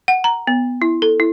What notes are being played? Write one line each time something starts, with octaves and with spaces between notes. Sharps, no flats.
F#5
A#5
B3
E4
A4
E4